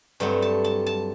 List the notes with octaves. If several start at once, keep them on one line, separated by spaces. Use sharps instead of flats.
G2 F#3 A3 C4
A5
A5
A5